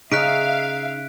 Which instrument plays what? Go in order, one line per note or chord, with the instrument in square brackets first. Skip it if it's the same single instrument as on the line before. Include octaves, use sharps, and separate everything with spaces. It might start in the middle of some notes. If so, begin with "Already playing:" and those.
[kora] C#3 [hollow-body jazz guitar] D#4 [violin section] E5 F5 [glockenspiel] F#6 B6 D7